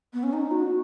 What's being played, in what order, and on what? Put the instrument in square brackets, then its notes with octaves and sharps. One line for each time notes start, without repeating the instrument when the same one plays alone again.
[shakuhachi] B3
C#4
D#4
F#4